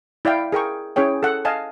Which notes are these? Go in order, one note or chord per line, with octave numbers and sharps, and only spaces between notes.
E4 D5 F5 G5
G#4 A#4 G5 C#6
C#4 E4 G#4 C#5 G5
A4 F#5
D#5 F5 G#5 A5